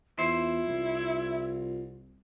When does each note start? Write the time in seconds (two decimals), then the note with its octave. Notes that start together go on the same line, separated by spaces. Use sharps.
0.19 E2 E4 F4 C5
0.68 C2